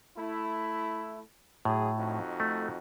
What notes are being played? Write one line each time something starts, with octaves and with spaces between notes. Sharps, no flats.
A3 E4
A2 F#3 G#4
F2 D#4 F#4
A3